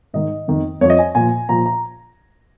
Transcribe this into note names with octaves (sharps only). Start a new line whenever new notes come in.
G#2 D#3 D#5
F2 D#3
F2 F3 C#5 D#5
G#5
A#2 F3 G#5
A#2 F3 A#5
A#5